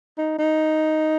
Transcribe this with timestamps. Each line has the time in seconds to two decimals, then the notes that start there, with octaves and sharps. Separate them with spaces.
0.18 D#4
0.38 D#4